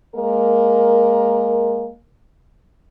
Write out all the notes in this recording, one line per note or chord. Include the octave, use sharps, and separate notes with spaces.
G#3 A#3 A#4